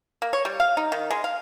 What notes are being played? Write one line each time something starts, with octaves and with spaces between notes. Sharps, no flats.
A#3
C#5
G3
F5
D#4
D#3
G#3
F5